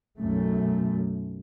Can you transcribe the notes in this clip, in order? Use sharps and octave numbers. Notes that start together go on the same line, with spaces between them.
B1 F#2 A3